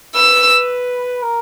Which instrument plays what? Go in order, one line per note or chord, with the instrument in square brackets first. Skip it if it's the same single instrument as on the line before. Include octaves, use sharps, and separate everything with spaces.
[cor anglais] B4 [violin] E6
[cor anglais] A#4